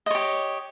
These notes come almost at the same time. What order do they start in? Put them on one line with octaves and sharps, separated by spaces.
D#5 C#5 G4